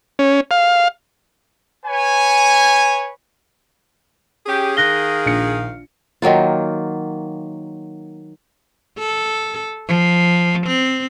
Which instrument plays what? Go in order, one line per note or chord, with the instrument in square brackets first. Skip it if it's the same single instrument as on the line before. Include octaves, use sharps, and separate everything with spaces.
[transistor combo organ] C#4
F5
[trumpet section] B4 C#5 G#5
[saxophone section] C#4 G4 [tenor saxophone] G#4
[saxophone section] D#3 F5 [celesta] F#6 A#6 G7
[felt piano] A#1 C#7
[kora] D#3 F#3 A#3 F4
[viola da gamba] A4
F3
C4